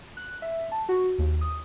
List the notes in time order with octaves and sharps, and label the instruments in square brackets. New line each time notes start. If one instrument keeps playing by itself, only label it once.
[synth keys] F#6
E5
A5
F#4
D#2
D#6